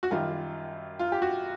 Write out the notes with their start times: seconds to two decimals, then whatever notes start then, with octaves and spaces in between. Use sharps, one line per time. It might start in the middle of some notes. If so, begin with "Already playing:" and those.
0.03 F#4
0.11 F#2 D#3 G3 F4
0.99 F4
1.12 G4
1.22 F#4